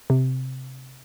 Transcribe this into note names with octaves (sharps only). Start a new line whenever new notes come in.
C3